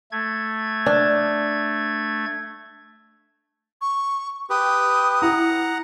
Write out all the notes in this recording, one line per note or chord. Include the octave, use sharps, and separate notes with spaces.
A3 G#6
D4
C#6
G4 B4 D#6
E4 F#5 A#5